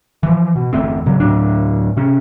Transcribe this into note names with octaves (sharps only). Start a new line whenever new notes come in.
E3 F3
B2
G1 E2 A3 C4
A#2 C#3 F#3
D1 A2 F#3 D4
C3 C#4